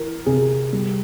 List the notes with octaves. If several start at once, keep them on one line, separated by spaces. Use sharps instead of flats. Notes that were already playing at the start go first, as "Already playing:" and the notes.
Already playing: E3 A#4
C3 G#4
G3